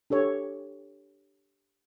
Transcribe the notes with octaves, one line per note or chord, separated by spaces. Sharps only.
D4 G4 A4 C#5